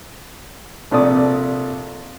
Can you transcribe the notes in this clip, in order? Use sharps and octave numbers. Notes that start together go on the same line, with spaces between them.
A#1 C3 A3 D5 D#6